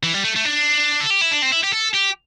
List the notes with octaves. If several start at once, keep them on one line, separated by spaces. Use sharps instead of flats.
E3
G3
A3
A3
D4
A4
G4
E4
D4
C4
E4
G4
A4
G4